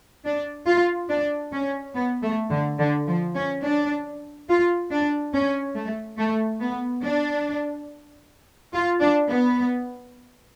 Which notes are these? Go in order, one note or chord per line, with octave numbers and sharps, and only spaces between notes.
D4
F4
D4
C#4
B3
A3
D3
D3
F3
C#4
D4
F4
D4
C#4
A3
A3
B3
D4
F4
D4
B3